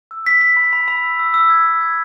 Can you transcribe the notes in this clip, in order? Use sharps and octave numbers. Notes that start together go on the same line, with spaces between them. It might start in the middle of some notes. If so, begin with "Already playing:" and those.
E6
B6
B6
B5
B5
B5
E6
E6
E6
G#6
E6
G#6